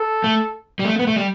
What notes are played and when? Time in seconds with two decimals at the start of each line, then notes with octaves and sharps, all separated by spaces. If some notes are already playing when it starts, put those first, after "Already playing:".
Already playing: A4
0.24 A3
0.79 G3
0.85 A3
0.99 B3
1.07 A3
1.16 G3